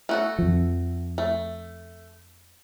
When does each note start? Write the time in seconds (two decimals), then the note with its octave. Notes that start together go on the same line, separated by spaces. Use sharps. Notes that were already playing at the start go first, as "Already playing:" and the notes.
0.09 A3 F#4 A4
0.39 F2 F3
1.18 A3